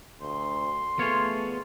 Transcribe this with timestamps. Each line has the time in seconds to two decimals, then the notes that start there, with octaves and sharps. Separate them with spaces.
0.21 D2 C6
0.99 A3 B3 F4 G#4 C#5